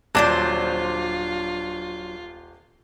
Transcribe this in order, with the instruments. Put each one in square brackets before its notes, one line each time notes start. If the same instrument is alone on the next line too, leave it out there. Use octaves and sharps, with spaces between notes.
[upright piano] D#1 A5 D6 [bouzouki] F#3 D4 C5 [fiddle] F4